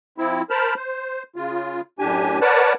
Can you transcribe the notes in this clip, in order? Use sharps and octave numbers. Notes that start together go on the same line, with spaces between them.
F3 C4 E4
A#4 C5 A5 B5 F6
C5
C#3 F4
F#2 A2 D4 G4 G#5
A#4 B4 C#5 D5 F#5 A5